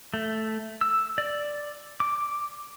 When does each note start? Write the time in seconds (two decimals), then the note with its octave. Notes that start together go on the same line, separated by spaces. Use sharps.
0.14 A3
0.81 E6
1.18 D5
2.00 D6